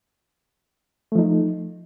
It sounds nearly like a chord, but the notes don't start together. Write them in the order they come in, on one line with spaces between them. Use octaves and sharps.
A3 F3 D#4